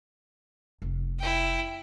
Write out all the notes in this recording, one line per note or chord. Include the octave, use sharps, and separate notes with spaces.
F1
E4 G5